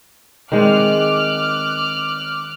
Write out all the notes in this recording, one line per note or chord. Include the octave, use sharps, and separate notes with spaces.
D#3 G#3 C4 D6 F6 F#6